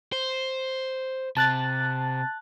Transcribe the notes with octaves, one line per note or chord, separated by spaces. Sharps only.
C5
C3 A5 F#6 A6